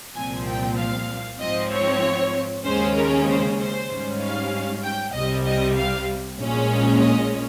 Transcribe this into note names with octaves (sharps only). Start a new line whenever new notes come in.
C2 A#2 F3 C4 G#5
G5
F5
G#2 F3 C4 D#5
C#5
D#2 C#3 G#3 C#4 C5
A#4
C5
C5
G#2 G3 C#4
F5
G5
C2 C3 G3 D#5
D#5
F5
A#1 A#2 G#3 C#4
D#5